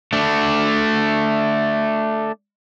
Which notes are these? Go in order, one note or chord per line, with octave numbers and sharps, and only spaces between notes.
A3 D4